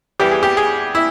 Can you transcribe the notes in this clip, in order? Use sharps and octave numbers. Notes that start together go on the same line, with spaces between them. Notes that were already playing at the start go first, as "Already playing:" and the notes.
E2 E3 G3 G4
G#4
G4
G#4
E4